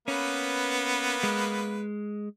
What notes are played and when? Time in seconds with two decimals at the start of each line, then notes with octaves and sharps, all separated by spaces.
0.08 A#3 B3 C#4 B4
1.23 G#3